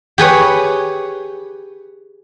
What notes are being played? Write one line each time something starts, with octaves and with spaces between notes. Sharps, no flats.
G4 G#4 B4 C#5